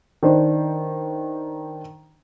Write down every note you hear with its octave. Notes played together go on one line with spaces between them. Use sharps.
D#3 D4 C5